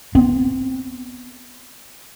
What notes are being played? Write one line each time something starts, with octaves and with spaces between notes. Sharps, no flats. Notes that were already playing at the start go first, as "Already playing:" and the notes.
B3 C4